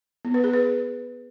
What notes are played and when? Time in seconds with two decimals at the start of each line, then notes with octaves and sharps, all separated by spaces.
0.25 B3
0.34 B4
0.44 G#4
0.53 B4